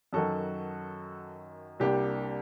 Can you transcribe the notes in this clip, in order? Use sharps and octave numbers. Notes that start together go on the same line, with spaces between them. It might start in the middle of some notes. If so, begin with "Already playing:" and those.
F#2 D#3 F#3 F#4 A4
C2 C3 G3 A#3 D4 G4